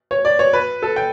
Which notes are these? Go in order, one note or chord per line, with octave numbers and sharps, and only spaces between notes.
C#5
D5
C#5
B4
A4
G5